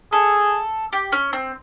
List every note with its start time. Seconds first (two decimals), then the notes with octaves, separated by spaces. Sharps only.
0.12 G#4 A4
0.93 G4
1.12 C#4
1.33 C4